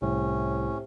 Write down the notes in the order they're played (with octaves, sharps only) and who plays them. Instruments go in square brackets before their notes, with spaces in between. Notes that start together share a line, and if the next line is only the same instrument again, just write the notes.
[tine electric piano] C2 [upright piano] A2 [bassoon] C3 [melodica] C#4